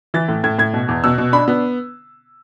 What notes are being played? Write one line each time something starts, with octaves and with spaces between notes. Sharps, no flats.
E3 A6
A2
A2 G#6
A2 G#6
B2
E2
B2 E6
B2
D4 B5
B3